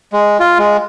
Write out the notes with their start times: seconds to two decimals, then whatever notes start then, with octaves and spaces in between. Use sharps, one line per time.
0.13 G#3
0.40 F4
0.58 G#3